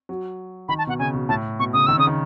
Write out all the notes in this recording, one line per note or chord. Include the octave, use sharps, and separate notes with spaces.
F#3
D#3 B5
A5
B2 F#5
C#3 G#5
B2
A2 A5
B2 C#6
C#3 D#6
D#3 E6
C#3 D#6
D#3